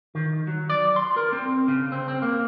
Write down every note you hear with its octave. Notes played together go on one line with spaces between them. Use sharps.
D#3
F#3
D5
C6
A#4
C4
C#3
C4
C4
A#3